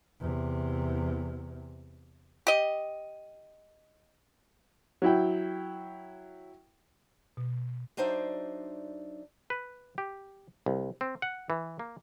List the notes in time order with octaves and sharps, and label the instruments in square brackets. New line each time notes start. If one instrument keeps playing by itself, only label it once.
[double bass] E2 C3
[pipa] G4 D#5
[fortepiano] F#3 E4 G5
[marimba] B2
[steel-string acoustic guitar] F#3 D4 D#4 C5 D5 E5
[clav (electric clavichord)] B4
G4
C2
C4
F#5
E3
A#3